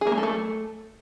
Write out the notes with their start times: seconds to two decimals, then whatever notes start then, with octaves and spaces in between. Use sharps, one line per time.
0.01 G#4
0.07 A#3
0.12 G#3
0.18 A4
0.23 A3